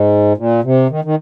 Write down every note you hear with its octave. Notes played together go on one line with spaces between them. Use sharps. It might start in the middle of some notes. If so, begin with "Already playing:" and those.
Already playing: G#2
A#2
C3
D#3
D#3